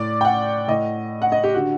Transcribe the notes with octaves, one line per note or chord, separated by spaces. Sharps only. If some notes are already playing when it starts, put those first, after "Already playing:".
Already playing: A2 D5
G5
F#5
A2 D#5
F#5
D#5
G4
D3 F#4